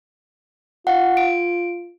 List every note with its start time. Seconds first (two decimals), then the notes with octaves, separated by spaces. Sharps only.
0.87 F4 F5 F#5
1.17 D7